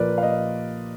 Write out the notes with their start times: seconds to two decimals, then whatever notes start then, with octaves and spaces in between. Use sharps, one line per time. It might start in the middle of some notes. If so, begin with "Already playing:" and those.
Already playing: A#2 F3 A#3 A#4 B4 D5
0.18 F5
0.23 A#3 D#5